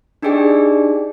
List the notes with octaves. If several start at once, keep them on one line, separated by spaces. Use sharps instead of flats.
D4 D#4 G4 G#4 D5 G5